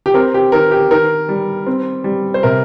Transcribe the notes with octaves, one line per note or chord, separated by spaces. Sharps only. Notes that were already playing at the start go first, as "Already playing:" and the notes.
G4
C4 A#4
G4
D#3 A#4
G4
D#3 A#4
G3
C4
G3
C5
C3 A#4